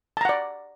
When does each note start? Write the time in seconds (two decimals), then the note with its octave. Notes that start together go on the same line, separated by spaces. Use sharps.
0.17 A5
0.21 A#5
0.25 F#5
0.29 D5